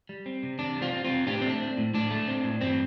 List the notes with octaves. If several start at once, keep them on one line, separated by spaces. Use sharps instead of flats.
G3
C4
C3
C3 D4
G3
C4 F4
C4
C4 F4
C3
A2 D4 G4
A3 C4
D4
C4
A2
A2 D4
A3
C4
A2
G2 C4